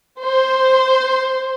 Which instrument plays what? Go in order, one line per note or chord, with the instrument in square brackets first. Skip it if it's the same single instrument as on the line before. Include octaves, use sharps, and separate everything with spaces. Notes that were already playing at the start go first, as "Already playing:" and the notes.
[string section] C5